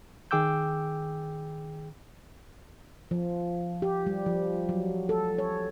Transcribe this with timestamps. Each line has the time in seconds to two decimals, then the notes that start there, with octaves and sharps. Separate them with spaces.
0.31 D#3 G#4 G5 D6 E6 G6
3.11 F3
3.82 G4
4.06 G3
4.26 F3
4.69 F#3
5.09 A4
5.38 C#5